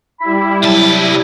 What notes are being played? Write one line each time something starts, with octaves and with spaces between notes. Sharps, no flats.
G3 E4 B5
C2 F#3 A5